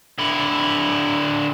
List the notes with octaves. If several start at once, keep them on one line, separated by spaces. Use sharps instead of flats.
D3 E4